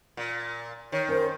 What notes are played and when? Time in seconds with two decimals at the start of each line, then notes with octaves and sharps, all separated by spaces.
0.17 A#2
0.92 D#3 C#5
1.08 C#4 A#4 C5